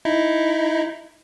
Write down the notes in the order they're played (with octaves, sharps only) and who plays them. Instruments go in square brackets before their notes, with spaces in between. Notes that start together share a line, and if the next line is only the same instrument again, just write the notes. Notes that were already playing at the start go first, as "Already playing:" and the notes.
[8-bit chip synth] D#4 E4